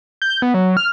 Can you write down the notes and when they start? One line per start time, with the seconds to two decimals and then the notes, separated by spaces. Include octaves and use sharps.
0.22 G6
0.42 B3
0.54 F#3
0.77 F6